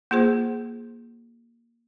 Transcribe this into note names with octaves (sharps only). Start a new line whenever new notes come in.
A#3 F4 G#4 C5